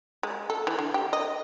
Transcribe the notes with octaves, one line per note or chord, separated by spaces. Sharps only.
G#3
A4
E3
D3
G4
D#5